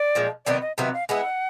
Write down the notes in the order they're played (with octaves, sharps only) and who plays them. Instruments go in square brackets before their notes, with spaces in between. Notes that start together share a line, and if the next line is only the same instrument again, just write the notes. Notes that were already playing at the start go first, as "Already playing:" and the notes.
Already playing: [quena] D5
[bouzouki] A#2 F3 G#3
[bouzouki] C3 D#3 F#3 B3 [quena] D5
[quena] D#5
[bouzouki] C3 D#3 F#3 B3 [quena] E5
[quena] F5
[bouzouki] G#3 B3 E4 [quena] F#5